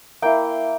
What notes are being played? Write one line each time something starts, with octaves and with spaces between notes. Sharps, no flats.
A#3 E4 G5